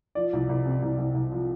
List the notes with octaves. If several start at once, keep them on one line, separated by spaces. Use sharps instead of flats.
F3 D5
C2
C2
C3
C2
C2
C2
F3